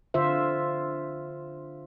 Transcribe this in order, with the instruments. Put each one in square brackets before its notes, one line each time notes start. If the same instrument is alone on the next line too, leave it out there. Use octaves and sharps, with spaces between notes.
[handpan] D3 F4 C5 E5